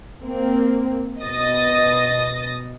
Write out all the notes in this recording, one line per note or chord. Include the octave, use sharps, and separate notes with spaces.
A#3 C4
B2 D#5 D#6 A6 A#6